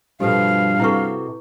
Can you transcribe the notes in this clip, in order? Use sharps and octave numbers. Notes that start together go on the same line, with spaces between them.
G2 B2 F3 G4 A4 B4 F5
C3 E4 F#4 A4 B4 C#6